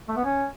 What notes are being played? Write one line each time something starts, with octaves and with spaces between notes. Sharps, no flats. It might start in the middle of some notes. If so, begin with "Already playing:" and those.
A3
B3
C#4